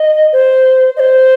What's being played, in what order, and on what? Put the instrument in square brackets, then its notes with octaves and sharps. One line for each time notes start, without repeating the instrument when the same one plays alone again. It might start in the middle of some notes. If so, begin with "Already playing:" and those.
Already playing: [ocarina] D#5
C5
D#5
C5